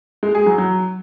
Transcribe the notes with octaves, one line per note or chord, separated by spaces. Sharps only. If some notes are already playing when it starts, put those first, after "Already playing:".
G#3
G#4
F#3
F#3